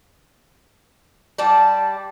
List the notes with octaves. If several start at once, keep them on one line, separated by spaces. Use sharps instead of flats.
G3 D5 A5